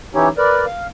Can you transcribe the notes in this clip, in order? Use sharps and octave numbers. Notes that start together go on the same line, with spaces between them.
E3 C#4 D#4 E4 G4 C#5
A#4 B4 D5
F5